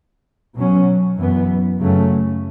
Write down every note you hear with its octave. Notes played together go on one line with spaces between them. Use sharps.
B2 F#3 C#4
F#2 E3 B3
F#2 C#3 F#3 A3 C#4